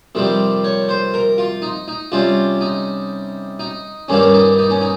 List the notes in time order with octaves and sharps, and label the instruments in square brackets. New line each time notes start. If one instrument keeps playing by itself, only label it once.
[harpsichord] F2 C3 D#3 G3
C#5
C5
A#4
F4
D#4
D#4
C3 G3 C#4 F4
D#4
D#4
G2 D#3 G3 A#3 C#4
D#4
D#4
C#4
D#4